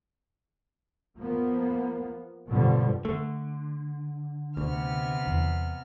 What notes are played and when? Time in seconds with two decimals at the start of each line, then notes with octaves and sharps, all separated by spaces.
1.17 F3 A#3 B3
2.47 G2 B2 D3 F3 G3 B3
3.05 D3 A3
4.57 D2 C3 B3 F6
5.27 E2